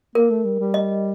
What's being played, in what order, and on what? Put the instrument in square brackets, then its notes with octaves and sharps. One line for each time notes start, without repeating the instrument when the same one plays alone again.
[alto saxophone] A#3 [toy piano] A#4
[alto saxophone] A3
G3
G3
[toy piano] D#5